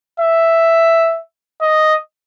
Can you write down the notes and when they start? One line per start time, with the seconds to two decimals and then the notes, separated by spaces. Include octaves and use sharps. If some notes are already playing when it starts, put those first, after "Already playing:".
0.20 E5
1.62 D#5